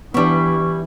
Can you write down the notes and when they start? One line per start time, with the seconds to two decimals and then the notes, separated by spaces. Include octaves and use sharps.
0.14 E3 G3 B3 D4 E4 C#6